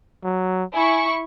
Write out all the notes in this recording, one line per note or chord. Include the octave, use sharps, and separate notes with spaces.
F#3
E4 G#5 C#6